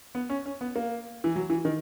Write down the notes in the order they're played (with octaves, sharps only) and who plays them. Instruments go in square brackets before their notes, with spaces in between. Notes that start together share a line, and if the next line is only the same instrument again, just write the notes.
[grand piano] B3
C#4
C#4
B3
A#3
E3
F#3
E3
D#3